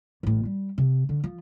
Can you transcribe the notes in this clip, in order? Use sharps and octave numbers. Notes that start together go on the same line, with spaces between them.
A1 A2
G3
C3
D3
F3